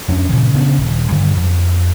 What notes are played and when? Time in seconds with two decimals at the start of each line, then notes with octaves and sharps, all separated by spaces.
0.08 F2 C#4 D4
0.29 A#2 C#3 E3
0.54 C#3 B3 D4
0.78 D#1
1.12 G2 D3 D#3
1.36 F2